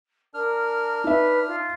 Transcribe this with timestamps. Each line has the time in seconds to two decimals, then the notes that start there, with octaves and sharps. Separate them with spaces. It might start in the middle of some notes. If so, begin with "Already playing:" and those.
0.34 D4 A#4 F6
1.04 D#4 B4 E5
1.47 F4